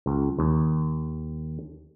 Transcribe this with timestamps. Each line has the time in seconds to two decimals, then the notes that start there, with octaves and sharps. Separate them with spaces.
0.06 C#2
0.39 D#2